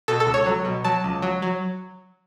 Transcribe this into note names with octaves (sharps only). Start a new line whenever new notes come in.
B2 A4
A4
C#2
C#5
F#3
B2
F#3 A5
C#2
F#3
F#3